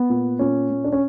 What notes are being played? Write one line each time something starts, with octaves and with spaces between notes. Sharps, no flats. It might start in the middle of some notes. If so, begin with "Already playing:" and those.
Already playing: B3
A#2
A#2 C#4
A#2
D4
C#4